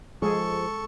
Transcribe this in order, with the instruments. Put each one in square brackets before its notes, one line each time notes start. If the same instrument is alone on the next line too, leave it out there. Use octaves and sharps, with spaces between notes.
[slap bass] F3 [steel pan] G#3 G#4 [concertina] A4 C#6